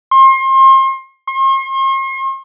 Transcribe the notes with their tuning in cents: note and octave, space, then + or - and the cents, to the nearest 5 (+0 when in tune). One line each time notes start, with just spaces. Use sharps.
C6 +35
C6 +45